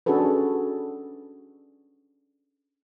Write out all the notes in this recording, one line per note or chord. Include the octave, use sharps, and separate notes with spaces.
C#4 D4 F#4 G#4 A4 B4